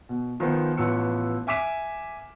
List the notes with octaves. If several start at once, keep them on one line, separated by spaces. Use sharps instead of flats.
B2
D#3 F3 B3 D#4 C5
A1 F3 B3 E6 C#7
E5 G#5 D6 B6 E7